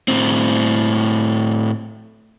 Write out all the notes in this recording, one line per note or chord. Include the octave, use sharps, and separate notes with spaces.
A2 C4